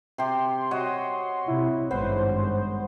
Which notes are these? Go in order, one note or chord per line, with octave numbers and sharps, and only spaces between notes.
C3 G4 C6
F#4 C#5 D#5
C3 E4
G#1 G2 G#3 B3 C5